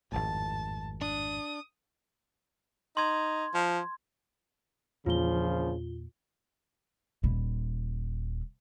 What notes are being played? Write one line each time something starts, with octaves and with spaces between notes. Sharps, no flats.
G#1 F2 A2 A5
D4 D#6
D#4 C6 G#6
F3
A#1 E2 A#2 C#3 F3 A#3 F4 G7
D#1 E4